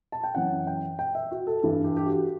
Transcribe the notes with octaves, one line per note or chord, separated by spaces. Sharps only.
A5
G5
F#2 E3 F#5
G5
G5
E5
F#4
A4
G2 E3 A4
G4
G4
F#4